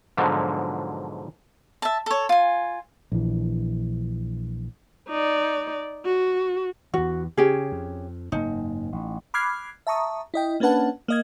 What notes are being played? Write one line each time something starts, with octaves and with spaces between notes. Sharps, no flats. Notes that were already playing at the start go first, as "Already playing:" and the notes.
G#2 B2 D3 F3 F#3
E5 A5
A4 C#5
F4 G#5
A#1 E3
D#4 D5
F#4
E2 E3 F#4
C#3 C#4 G4 G#4
F2
F#1 G#2 A#3 D#4
A1
B5 D6 F6 F#6 G#6 C7
E5 A5 A#5 C#6 D#6
E4 D#5 G5
A#3 C#4 D4 B4 F#5 A5
A#3 D#5 G#6